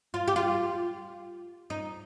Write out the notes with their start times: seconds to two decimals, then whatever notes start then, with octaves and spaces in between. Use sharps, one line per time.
0.14 F4
0.28 G4
0.36 F4
1.70 D#4